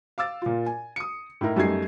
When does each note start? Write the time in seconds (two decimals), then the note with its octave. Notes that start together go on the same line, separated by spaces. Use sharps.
0.18 F5 D6 E6 A6
0.42 A#2 F4
0.66 G#5
0.96 D#6 C#7
1.41 A2 D#4 E4 A#4
1.56 F#2 G3 A3 D#4 G#6 C7